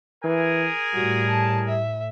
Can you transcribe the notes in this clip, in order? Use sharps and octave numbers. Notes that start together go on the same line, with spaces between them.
E3 G#4 A#4 G#5
A2 G3 F#4
A5
E5